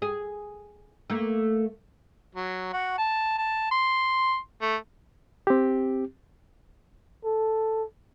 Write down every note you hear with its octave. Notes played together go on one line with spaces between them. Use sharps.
G#4
A3 A#3
F#3
F#4
A5
A5
C6
A3
C4 G4
A4